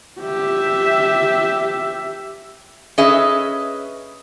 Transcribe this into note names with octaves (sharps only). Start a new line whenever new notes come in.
G4 E5
C#4 G#4 B4 D#5 E5